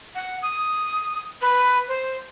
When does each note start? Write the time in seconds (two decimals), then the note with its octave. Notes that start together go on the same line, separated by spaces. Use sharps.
0.15 F#5
0.42 D#6
1.42 B4
1.88 C5